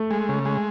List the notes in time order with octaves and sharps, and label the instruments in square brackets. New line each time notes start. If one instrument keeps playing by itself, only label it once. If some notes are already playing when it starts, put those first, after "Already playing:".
Already playing: [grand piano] A3
[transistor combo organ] G#3
C#3
G#3